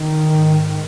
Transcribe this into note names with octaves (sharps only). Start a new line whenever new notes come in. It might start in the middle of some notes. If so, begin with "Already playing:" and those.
Already playing: D#3
G#2